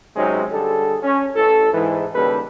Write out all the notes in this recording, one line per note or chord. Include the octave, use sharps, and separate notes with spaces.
C3 F#3 G#3 C4 C#4 D#4
D3 G3 G#4 A4
C#4
A1 A4
G#2 E3
D#2 C#3 G3 A#3 A4 B4